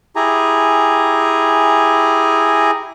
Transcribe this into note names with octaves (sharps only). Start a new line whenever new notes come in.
E4 G4 G#4 G#5 A#5